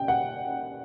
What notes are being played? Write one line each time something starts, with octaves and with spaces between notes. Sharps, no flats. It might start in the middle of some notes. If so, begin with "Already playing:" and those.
Already playing: G5
F#5